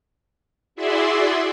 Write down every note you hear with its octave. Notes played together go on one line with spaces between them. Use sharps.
E4 F#4 G#4 D5 E5 C6